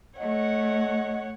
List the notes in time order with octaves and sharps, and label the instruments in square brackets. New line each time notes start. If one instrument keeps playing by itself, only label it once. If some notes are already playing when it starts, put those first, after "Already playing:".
[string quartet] A3 [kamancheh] C#5 F#5 [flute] D#5